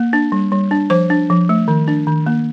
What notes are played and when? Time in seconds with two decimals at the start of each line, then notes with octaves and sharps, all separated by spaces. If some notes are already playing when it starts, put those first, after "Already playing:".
Already playing: A#3
0.13 D4
0.32 G3
0.52 G3
0.71 D4
0.90 F3 C5
1.10 D4
1.30 F3
1.49 A3
1.68 D#3
1.88 D4
2.07 D#3
2.26 A#3